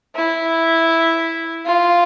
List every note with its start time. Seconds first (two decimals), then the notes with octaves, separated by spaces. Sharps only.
0.15 E4
1.66 F4